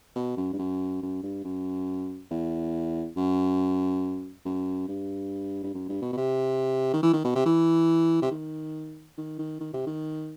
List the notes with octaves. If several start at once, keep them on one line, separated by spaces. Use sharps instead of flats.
B2
F#2
G2
F#2
F#2
G2
F#2
E2
F#2
F#2
G2
G2
F#2
G2
B2
B2
C3
D#3
E3
D#3
B2
C3
E3
C3
D#3
D#3
D#3
D#3
C3
D#3